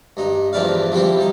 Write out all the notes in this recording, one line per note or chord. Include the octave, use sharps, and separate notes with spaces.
G2 D#4
E2 G2 F3 E4 D5 F5
F3 G3 C4 E4
G3 D#4